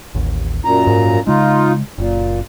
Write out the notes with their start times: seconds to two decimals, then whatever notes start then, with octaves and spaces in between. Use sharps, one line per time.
0.15 A1 D#2
0.64 F#2 A#2 A#5
0.87 G#2
1.27 C#3 G#3 D#4 F4
1.98 F#1 A#2